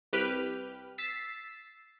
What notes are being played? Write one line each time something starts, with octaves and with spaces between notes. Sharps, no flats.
C2 G4 B4 F6
E6 A6 B6 C7